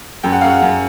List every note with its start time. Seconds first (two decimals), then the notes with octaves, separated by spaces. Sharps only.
0.23 F#2 G5
0.32 F#5
0.41 F#2 F5
0.50 F#5
0.62 F#2